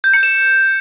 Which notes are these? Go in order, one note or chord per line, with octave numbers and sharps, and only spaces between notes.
G6
C#7
E7